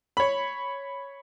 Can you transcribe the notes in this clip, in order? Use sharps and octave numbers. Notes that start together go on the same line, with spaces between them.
C#5 B5